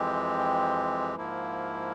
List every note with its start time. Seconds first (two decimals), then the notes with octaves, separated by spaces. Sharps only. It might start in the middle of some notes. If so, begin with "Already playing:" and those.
Already playing: F2 E3 G#3 C4 G4
1.16 G#2 F3 A#3 E4